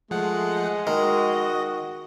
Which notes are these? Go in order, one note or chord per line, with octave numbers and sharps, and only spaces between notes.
F3 G#3 A3 F#5
D#3 F#4 D#5